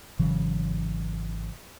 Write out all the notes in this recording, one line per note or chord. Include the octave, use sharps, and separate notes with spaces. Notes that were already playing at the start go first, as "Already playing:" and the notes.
G#1 C#3 E3 F#3